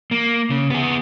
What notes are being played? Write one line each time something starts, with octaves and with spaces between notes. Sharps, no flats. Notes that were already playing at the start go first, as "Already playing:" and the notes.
A#3
C#3
B3 G#4